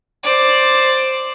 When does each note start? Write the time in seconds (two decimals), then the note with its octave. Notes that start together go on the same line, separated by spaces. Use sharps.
0.23 C5 D5